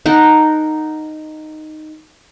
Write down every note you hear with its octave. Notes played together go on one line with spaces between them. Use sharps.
D#4 A#4 F#5 A5